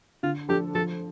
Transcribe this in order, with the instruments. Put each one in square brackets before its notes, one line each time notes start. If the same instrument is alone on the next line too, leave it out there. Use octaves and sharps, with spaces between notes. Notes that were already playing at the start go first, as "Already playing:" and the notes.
[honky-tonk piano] D3 [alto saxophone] F4
[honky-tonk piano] F3 D4 A4 [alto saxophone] G4
[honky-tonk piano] F3 [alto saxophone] A4